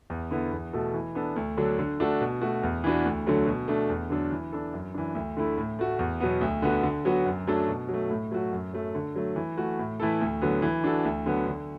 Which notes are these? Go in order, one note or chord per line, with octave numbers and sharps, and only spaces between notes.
E2
D3 B3 E4
E2
B2 A3 F#4 A4
E3
B3 D4 A4
D2
D3 F#3 D4 A4
D3
A3 D4 F#4 A4
B2
A3 F#4
E2
E3 B3 D4 F#4
D2
D3 F#3 A3
B2
A3 D4 A4
E2
D3 F#3 D4 A4
E3
D4 A4
F#2
E3 D4
D2
D3 A3 E4
A2
A3 F#4
E2
B2 F#3 B3
D2
D3 B3 F#4
D3
F#3 B3 F#4
F#2
F#3 A3 D4 A4
B2
F#3
A3
A2
F#3 A3 F#4
F#2
F#3 A3
D3
F#3 A3
E3
A3 F#4
A2
E3 A3 E4 A4
D2
D3 F#3 B3
E3
D4 F#4 A4
D2
D3 F#3 B3
D3